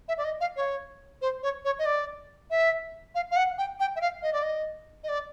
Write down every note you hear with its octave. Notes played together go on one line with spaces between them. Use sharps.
E5
D5
D#5
F5
C#5
C5
C#5
C#5
D#5
D5
E5
F5
F5
F#5
G5
G5
E5
F5
D#5
D5
D#5
D#5
D5